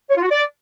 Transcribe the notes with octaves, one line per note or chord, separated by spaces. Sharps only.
C#5
F4
F#4
D5